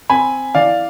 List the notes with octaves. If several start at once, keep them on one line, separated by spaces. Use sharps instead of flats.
C4 G#5 B5
E3 D5 F5